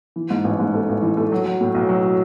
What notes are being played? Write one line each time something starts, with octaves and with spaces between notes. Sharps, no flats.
E3
G#2
A1
G#2
A3
A1
E3
A3
F#3
F#3
A2
B1
F#3